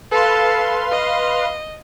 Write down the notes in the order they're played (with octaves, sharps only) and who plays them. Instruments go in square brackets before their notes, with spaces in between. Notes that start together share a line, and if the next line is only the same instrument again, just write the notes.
[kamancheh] A4 [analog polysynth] B4 F5 C6
[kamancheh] D#5